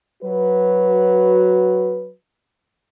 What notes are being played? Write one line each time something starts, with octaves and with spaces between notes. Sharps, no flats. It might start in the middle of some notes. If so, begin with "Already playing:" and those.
F#3 F#4 B4